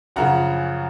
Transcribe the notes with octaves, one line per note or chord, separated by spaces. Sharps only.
F#2 C#3 F3 F#5 A#5